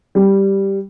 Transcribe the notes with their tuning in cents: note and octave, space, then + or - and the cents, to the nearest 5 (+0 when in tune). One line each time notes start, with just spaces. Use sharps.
G3 +0